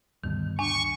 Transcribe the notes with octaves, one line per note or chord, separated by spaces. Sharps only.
D2 G2 B2 D#3
D4 G#5 C#6